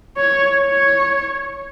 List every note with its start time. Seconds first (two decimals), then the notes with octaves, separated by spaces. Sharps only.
0.17 C#5
0.62 C#5